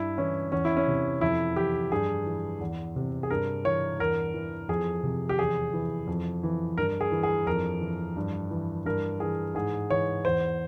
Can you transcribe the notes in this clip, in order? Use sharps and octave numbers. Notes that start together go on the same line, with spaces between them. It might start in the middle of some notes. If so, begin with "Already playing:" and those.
Already playing: G2 E4
E3 C#4
E2 C#4
E4
C#4
C3
F2 E4
E3 G4
G2 G#4
E3
E2
C3
G#4
G2 A#4
E3 C#5
E2 A#4
E3
F2 G#4
C3
G4
E2 G#4
E3
F2
E3
G2 A#4
G#4
E3
G#4
F2 A#4
E3
G2
E3
G2 A#4
E3 G#4
G#2 G#4
E3 C#5
E2 C5